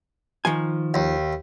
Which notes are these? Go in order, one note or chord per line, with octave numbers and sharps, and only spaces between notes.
D#3 F3 G#5
D#2